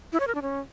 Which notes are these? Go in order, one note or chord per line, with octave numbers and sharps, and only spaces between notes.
E4
C#5
A#4
D4
C#4